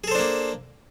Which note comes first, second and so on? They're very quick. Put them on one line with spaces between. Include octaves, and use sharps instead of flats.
G#4 A4 C5 D4 A#3